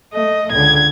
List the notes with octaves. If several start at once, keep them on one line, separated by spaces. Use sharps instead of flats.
A3 D#5
C#2 D3 G#6